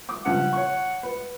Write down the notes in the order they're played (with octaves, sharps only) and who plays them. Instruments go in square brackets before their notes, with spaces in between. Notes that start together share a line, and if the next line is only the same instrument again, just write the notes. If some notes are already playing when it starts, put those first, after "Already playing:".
[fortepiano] D6 D#6
[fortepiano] G2 C#3 F3 [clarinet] F#5
[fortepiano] C#5 C#6
B4